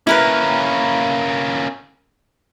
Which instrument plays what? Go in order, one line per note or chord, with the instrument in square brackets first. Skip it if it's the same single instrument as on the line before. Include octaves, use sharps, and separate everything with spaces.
[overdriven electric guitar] A#3 C#4 [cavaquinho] E4 A#4 B4